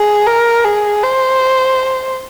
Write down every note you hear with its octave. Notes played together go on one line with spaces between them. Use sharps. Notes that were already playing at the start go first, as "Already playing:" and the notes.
Already playing: G#4
A#4
G#4
C5